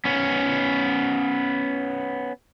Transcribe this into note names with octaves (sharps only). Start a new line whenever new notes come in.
B3 C#4